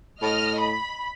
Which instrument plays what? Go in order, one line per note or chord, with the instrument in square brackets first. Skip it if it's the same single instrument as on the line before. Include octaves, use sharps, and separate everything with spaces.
[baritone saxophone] A2 [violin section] D#5 F6
[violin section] B5